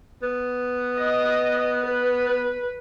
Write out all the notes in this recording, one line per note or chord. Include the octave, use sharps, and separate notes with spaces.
B3
D#5
B4